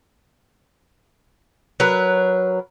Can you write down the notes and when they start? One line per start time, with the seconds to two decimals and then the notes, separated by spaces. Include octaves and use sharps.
1.80 F#3 A#4 B4